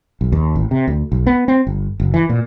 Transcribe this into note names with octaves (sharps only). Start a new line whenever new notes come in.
B1
D#2
A1
C3
D2
B1
B3
C4
G1
F#1
E3
A#2